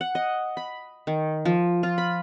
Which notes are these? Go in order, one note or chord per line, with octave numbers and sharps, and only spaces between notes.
F#5
D#5
B5
D#3
F3
F4
B5